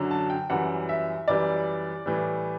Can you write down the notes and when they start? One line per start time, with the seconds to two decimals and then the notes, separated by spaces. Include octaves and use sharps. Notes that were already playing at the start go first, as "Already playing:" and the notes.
Already playing: F#2 D3 F#3
0.11 A5
0.30 G5
0.50 F#2 E3 G3 F#5
0.89 E5
1.28 F#2 E3 G3 D5
2.06 A2 E3 G3